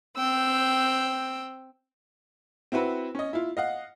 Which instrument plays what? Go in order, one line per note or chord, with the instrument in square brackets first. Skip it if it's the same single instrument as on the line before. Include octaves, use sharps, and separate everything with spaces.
[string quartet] C4 G5 E6
[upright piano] C4 E4 F#4 B4
C#4 D#5
E4 F4
D#5 F5 F#5